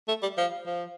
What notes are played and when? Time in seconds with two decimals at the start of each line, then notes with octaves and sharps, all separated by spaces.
0.08 A3
0.23 G3
0.38 F3
0.66 F3